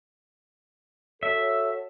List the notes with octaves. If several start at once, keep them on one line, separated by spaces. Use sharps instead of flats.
F#4 A4 C#5 E5